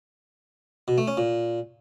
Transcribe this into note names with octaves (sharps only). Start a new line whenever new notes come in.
B2
A3
C#4
A#2